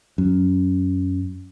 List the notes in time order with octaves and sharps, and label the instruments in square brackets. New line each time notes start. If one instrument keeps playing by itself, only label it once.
[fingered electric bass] F#2